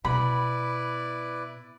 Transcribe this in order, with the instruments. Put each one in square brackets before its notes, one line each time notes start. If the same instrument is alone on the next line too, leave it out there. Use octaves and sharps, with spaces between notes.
[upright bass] B2 [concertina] E4 B4 D5 [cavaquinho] B5